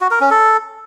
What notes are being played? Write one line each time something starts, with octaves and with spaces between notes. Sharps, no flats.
F#4
A#4
C#4
A4